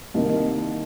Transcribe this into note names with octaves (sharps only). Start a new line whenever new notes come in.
C2 C3 D#3 A#3 D#5